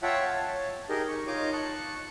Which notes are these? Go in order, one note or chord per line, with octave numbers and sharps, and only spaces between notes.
F4 C#5 E5 F#5 G5 A5
C#5 A5
D#4 G4 G#4 A#4 D#5
C#6
D#4 F4 C#5 D#5 D6
A5 C#6 F#6